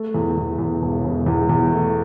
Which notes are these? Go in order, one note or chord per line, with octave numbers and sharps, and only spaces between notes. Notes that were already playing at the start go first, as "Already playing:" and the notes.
Already playing: A3
E2
E2
E2
E1
E1
E2
E2
A3